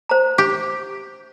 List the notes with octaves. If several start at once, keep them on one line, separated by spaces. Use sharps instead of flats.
C5 A#5
G4